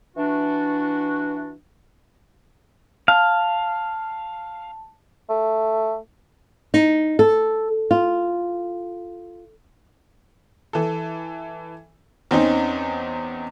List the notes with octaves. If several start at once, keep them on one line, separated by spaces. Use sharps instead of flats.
E3 D4 F#4
F5 A5
A3
D#4
A4
F4
E3 A4
E2 C4 C#4 D#4